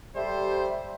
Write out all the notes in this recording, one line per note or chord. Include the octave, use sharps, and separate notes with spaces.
G3 G4 A4 C5 E5